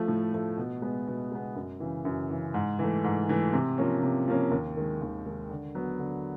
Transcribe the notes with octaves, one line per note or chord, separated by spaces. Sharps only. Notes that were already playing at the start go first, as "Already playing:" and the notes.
Already playing: F3 A3
A2
F3 A3
B2
G#3 B3
B2
G#3 B3
F#2
C#3 E3
F#2
C#3 E3
G#2
E3 A3
G#2
E3 A3
C3
F3 A#3 C#4
C3
F3 A#3 C#4
D#2
D#3 G#3
D#2
D#3 G#3
D3
F#3 B3
D3